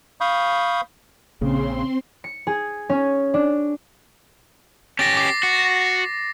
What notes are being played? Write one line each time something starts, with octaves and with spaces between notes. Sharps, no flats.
F5 B5 C#6 D#6 G6
A#1 C#3 A#3 C4 C6
C#7
G#4
C#4
D4
C#4 G4 A6 A#6
D6 C7
F#4